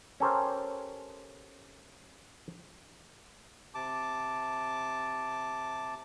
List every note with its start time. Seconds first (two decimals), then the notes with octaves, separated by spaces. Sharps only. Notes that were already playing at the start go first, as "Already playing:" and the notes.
0.20 C#4 G4 A4 A#4 C5
3.74 C3 A5 D6